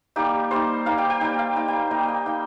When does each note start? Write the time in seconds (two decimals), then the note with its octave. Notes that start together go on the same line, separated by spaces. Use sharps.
0.16 G3 A#3 D#4 G4
0.51 G3 A#3 D#4 C5
0.86 G3 A#3 D#4 F5
0.98 G5
1.10 G5
1.21 G3 A#3 D#4 G5
1.39 F5
1.56 A#3 D#4 G5
1.68 G5
1.91 A#3 D#4 D#5
2.08 G5
2.26 A#3 D#4 G5